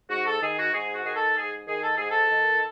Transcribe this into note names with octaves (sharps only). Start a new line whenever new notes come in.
G#2 F#4
A4
D#3 G#4
F#4
G#2 G#4
F#4
D#3 G#4
A4
G#2 G#4
D#3 G#4
A4
G#2 G#4
A4
D#3